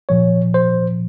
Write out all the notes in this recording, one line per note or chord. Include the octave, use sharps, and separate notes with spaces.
A#2 F3 C#5
C5